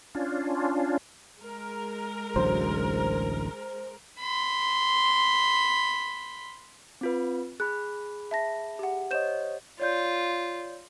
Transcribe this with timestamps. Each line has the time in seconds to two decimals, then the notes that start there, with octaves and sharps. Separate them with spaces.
0.15 C#4 D4 F4
1.40 G#3 A#4
2.36 A1 D2 F#3 C5
4.20 B5 C6
7.01 C4 F4 B4
7.60 G#4 B5 F#6
8.31 E5 A5 A#6
8.79 G4 F#5
9.11 C5 C#5 D#5 G6 E7
9.80 F4 C#5 D5 G6